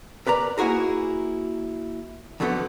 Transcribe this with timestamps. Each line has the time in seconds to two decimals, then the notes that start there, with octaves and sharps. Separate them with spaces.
0.27 A#4 B4 D5 A#5
0.58 A#3 E4 F#4 G#4 A#4
2.40 F2 D3 F#3 A3 B3